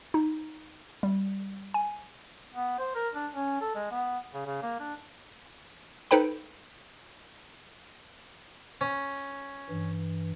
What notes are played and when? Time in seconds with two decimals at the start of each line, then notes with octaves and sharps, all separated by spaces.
0.14 D#4
1.03 G3
1.74 G#5
2.54 B3
2.79 C5
2.95 A#4
3.15 D4
3.34 C#4
3.61 A4
3.75 G#3
3.91 B3
4.34 C#3
4.46 C#3
4.63 A#3
4.80 D4
6.11 D#4 A4 B4 C5 G5 B5
8.81 C#4
9.70 G2 E3